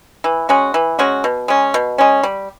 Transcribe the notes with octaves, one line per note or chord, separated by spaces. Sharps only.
E3
G#3 C#4 F#4
E3
G#3 C#4 F#4
B2
G#3 C#4
B2
G#3 C#4
G3